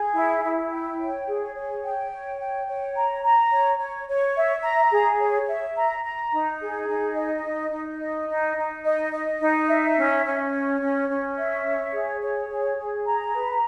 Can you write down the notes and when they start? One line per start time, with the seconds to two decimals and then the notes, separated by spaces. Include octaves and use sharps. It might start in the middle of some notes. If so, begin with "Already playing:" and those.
Already playing: G#4
0.14 E4
0.43 E4
0.70 G5
0.99 C#5
1.27 G#4
1.55 C#5
1.84 G5
2.12 C#5
2.39 G5
2.68 C#5
2.96 A#5
3.24 A#5
3.51 C#5
3.79 C#5
4.08 C#5
4.36 E5
4.63 A#5
4.92 G#4
5.20 C#5
5.48 E5
5.76 A#5
6.04 A#5
6.32 D#4
6.60 G#4
6.89 D#4
7.16 D#5
7.45 D#4
7.72 D#4
8.01 D#5
8.29 D#4
8.57 D#4
8.85 D#5
9.13 D#5
9.41 D#4
9.68 E5
9.98 C#4
10.25 C#4
10.53 C#5
10.81 C#4
11.09 C#4
11.37 E5
11.66 C#5
11.93 G#4
12.21 C#5
12.49 G#4
12.78 G#4
13.06 A#5
13.34 B4